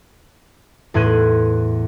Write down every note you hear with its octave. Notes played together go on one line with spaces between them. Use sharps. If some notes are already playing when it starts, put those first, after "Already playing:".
E2 A2 C6 F#6 G#6 D#7